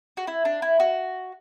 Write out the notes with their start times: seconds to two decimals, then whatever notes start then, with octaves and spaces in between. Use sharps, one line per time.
0.17 F#4
0.27 E4
0.45 D4
0.62 E4
0.80 F#4